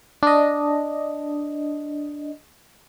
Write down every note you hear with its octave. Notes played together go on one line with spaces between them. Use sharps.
D4 D#5